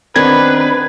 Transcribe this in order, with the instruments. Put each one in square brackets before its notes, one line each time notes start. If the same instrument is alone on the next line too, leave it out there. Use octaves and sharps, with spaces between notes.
[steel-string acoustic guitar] D#3 B3 D4 [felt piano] C4 [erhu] B4 [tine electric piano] G#6